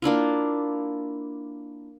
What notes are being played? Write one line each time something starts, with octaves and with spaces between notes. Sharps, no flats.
A#3 D4 E4 F4